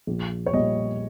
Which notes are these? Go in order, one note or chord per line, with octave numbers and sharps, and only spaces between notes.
A#1
C#5
A#2 G3 D#5